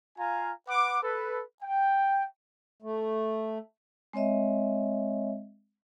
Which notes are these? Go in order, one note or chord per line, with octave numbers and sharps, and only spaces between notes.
F4 F5 G#5 A#5
B4 F#5 D6
A4 B4
G5
A3
G#3 C4 C#5 D#5 E5